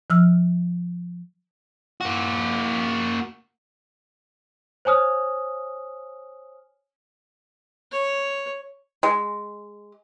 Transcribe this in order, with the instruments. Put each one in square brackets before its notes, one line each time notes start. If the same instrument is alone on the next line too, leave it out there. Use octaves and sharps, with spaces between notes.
[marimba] F3 E6 F6
[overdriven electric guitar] A#3 F#4
[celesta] C5 C#5 G#5 D#6 F6
[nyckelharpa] C#5
[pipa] G#3